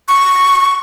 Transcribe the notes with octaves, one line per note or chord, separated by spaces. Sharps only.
C#6